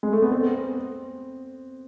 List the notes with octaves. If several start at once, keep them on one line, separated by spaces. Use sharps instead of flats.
G#3
A3
B3
C4